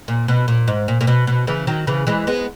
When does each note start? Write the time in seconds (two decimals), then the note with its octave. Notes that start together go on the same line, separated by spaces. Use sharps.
0.08 A#2
0.28 B2
0.48 A#2
0.68 G#2
0.88 A#2
1.01 A#2
1.07 B2
1.27 B2
1.47 C#3 E3
1.67 D#3 F#3
1.87 C#3 E3
2.07 E3 G#3
2.27 G#3 B3